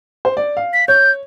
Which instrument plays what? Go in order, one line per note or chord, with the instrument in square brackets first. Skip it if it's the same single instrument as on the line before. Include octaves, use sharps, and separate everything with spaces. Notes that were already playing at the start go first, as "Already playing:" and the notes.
[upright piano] C5
D5
F5
[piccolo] B6
[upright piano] C#5 [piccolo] G6